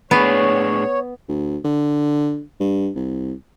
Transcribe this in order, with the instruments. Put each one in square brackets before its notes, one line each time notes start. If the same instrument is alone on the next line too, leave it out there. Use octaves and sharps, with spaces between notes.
[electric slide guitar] A2 D4 G#4 [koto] B3 [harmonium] C#5
[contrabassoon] D2
D3
G2
C2